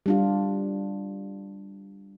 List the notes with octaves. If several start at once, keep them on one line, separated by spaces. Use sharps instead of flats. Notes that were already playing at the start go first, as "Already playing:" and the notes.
G3 D4 F4